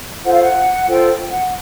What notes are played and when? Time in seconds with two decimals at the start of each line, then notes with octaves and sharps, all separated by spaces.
0.23 F4 A4 C5 F#5
0.32 F5
0.42 F#5
0.86 F4 A4 C5 G5
1.08 G5
1.29 F#5